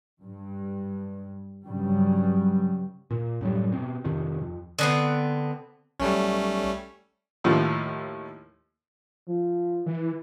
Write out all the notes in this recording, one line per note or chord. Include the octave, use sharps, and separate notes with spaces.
G2
G2 C#3 F#3 G3
A#2
F#2 A2 F#3 G3
B2 C4
F2 C3 D#3
F2
D3 B3 C4
B1 G3 A3 C#4
D#2 A2 F3
F3
E3